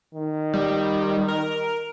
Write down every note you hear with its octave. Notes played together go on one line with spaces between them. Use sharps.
D#3
G3
A#4